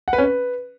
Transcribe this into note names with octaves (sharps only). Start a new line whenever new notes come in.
F#5
B4
C#4
B4